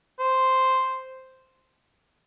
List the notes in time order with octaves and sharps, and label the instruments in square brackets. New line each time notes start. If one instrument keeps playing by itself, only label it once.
[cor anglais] C5